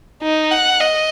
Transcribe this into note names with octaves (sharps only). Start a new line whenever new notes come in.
D#4
F#5
D#5